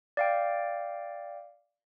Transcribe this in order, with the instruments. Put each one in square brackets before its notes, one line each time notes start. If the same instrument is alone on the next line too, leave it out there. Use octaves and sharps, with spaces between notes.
[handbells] D5 F5 G5